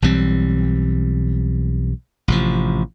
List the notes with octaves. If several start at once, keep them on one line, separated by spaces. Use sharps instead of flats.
B1 E3 G3 C4
A1 C3 F3